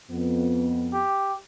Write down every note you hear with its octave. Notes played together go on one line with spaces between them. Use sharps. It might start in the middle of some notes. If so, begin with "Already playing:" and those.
F2 B3
G4